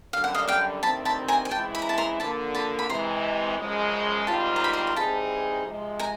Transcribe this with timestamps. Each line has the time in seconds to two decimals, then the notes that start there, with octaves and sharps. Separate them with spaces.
0.13 F#2 D3 G3 F5
0.24 F#5
0.34 D#5 F5
0.48 F5 G5
0.82 D2 C3 D#3 G3 C4 A5 B5
1.05 A5 B5
1.28 G#5 A#5
1.45 G#5
1.51 C#3 E3 G#3 C4 E4 G5 A5
1.75 B5
1.82 A#5
1.89 A5 B5
1.98 A#5 C6
2.20 D3 F3 A#3 A5 B5
2.55 A5 B5
2.79 B5
2.89 C3 E3 G#3 A#5 C6
3.58 F#2 C#3 F3 G#3
4.27 G#2 D#3 G3 C4 F4 A5 B5
4.56 A#5
4.64 B5
4.73 A#5 C6
4.87 A#5
4.96 E3 G3 C4 D#4 G#4 A5 B5
5.65 C3 F3 G#3
5.99 G#5 A#5